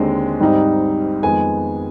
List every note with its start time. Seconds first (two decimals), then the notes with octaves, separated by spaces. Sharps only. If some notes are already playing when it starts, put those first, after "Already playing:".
Already playing: D#2 D3 G#3 C4
0.40 G#2 G3 C4 D#4
1.23 F2 D#3 G#3 B3 G#5